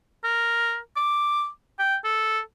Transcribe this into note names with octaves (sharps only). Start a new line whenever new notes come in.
A#4
D6
G5
A4